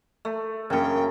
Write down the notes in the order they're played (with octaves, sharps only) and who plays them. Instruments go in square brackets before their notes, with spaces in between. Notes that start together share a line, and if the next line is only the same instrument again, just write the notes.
[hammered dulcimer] A3
[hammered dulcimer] F#2 C#3 [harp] A#3 C#4 [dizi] G5